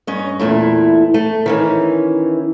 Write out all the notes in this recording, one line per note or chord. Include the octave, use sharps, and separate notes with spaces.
G2 C#4 D#5
E2 A#2 A3 E4
A3
D#3 E3 C#4